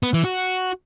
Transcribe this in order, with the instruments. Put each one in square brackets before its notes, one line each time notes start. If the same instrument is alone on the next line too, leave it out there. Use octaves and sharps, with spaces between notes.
[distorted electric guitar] B3
E3
F#4